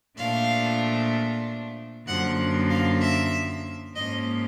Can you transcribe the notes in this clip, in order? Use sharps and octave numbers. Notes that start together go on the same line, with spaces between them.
A#2 F3 A3 D4 F5
F#2 D3 F3 A#3 F#5
F5
E5
G#2 F3 A#3 C#4 D#5